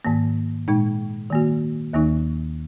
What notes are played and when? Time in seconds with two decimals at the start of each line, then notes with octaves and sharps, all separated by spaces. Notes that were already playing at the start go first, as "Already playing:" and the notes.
0.05 G#2 D#3 A#3
0.68 A#2 G#3 D#4
1.30 D#3 A#3 F#4
1.93 D#2 D#3 A#3 D#4